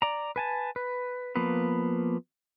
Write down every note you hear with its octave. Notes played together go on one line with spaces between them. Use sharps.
D5 A#5
B4 G#5 A5
B4
F3 A#3 B3 B4